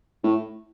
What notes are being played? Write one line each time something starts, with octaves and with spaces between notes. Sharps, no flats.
A2